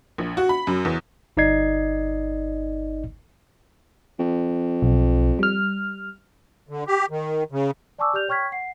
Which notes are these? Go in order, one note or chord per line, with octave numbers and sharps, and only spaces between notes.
A#1
F#4
B5
F#2
E2
G1 D#4 D5 D#5 G#6 C7
F2
B1
G3 F6
D3
G4
D#3
C#3
D5 G#5 A5 C#6 D6 E6
G4 D5 F6 G6 F7
C#5 G5 C#6 F6 G#6 B6
F#5 C7